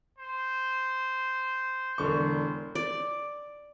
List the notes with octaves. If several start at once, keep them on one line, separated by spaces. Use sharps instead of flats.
C5
E1 D3 C#6
D5